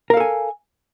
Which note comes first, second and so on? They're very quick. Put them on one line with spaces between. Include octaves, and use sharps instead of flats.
A#4 F5 A4 G#5